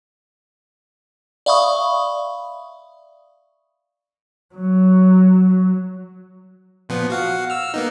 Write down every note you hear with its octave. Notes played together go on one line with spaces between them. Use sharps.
D5 E5 F5 B5 C#6 D#6
F#3
A#2 F3 B3
F#4 F5 F#5
E6 F6
A#3 B3 D#4